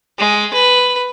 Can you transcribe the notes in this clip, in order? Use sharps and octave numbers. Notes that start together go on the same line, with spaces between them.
G#3
B4